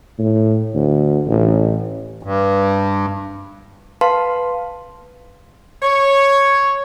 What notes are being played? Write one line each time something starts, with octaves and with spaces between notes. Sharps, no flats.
A2
D2
A1
G2
B4 F5 A5 C6
C#5